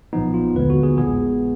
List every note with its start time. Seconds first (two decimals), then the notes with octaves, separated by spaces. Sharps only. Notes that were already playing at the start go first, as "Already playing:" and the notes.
0.13 B1 A#2 F3 B3 D#4
0.34 F4
0.55 D#2 D3 G#3 B3 B4
0.70 F#4
0.83 G#4
0.98 A#1 A#2 G#3 B3 G#4